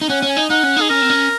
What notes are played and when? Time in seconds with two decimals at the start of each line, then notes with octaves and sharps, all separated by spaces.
0.01 D#4
0.09 C#4 F#5
0.22 C#4
0.29 G#5
0.37 D#4
0.50 D#4 F#5
0.63 C#4
0.76 D#4 G#4
0.90 C#4 A#4
1.02 C4
1.10 C#4